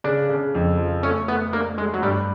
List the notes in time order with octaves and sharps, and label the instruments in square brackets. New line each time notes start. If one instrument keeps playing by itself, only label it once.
[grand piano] C#3 [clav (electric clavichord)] D4
[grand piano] C#3
F2
F3
[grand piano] A3 [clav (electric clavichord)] C#4
[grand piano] A3 [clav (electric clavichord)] B3
[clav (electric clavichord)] A#3 [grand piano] D4
[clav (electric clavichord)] G#3 [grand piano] A3
[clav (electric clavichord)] F#3
[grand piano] G2 [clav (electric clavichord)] G3